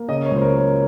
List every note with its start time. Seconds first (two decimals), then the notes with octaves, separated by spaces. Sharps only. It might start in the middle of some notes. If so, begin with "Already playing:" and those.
Already playing: A#3
0.08 C#3 D#5
0.25 C#5
0.31 C#2
0.36 C5
0.41 A#4
0.52 F#3
0.58 C#5